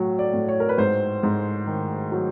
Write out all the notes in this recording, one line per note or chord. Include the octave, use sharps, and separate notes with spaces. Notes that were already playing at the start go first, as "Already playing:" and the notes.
Already playing: A2 F#3
D5
A2
C#5
A#4
B4
G#2 C5
G#2
D#3
F#3